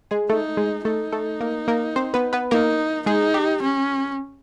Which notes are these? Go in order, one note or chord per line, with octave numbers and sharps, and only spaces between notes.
G#3 G#4
A3 D#4 A4
G#3 G#4
A3 D#4 A4
A3 A4
A#3 A#4
A#3 A#4
C4 C5
B3 B4
B3 B4
A#3 D#4 A#4
G#3 D#4 G#4
G4
C#4